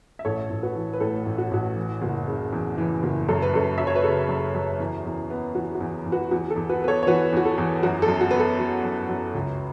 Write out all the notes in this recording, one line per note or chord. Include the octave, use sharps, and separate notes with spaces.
E5
A1 A4 C#5
A1
F#4 B4
E3
B4
A2 A4
A1
F#4
A1 F#4
E3
F#1
C#3
E2
E3
F#1
F#2 A4
B4
F#2 A4
F#3 E5
C#5
B4
C#3 A4
F#2
F#2
E2
E2
B3
E3 F#4
F#4
E2
E2
F#4 B4
E2 F#4
A4
E2
F#4 B4
B3 B4
A4 C#5
C#5
E3 F#4 B4
E2 F#4
A4
E2
F#2 F#4
A4
F#2
F#4
B3 B4
A4
F#3
F#2
F#2
C#2